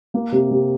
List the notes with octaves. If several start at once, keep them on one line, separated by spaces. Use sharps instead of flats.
A#3
C3
C3